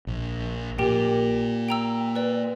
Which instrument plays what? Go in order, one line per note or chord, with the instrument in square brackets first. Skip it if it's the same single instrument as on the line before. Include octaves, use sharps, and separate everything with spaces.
[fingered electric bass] A#1
[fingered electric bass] A#2 [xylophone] G4 A#4 G5
[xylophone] G5 A#5 E6
B4 D5